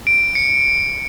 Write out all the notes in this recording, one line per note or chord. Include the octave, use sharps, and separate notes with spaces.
D7
C#7